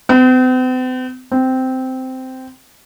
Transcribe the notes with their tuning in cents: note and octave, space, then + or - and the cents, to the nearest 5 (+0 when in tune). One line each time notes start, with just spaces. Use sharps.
C4 -45
C4 -10